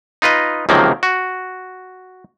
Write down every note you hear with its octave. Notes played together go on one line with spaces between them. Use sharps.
D#4 F4 B4 D#5
C#2 C3 D#3 F3 F#3 A#3
F#4